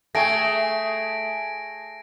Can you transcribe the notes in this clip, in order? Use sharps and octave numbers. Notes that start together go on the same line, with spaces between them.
A3 G#4 G5 G#5 A#6 D7